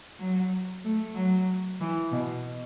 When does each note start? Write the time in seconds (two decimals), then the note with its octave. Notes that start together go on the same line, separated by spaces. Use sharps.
0.19 F#3
0.84 A3
1.15 F#3
1.80 E3
2.12 B2